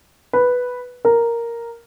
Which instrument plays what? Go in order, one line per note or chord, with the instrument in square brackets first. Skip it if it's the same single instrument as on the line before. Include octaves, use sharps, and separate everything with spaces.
[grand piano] B4
A#4